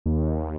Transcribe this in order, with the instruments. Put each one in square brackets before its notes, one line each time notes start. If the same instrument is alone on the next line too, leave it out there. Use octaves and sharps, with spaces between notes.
[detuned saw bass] D#2